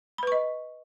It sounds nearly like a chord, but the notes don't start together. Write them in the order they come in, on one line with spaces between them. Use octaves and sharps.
B5 B4 C#6 D#5